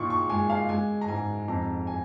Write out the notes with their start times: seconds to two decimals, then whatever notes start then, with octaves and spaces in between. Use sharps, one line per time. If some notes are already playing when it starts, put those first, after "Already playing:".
Already playing: A#2 D#3 C#6
0.10 C#6
0.30 G#3 G#5
0.50 F5
0.69 G#3 G#5
1.01 A#5
1.08 G#2 G#5
1.48 F2 A#5
1.87 G#5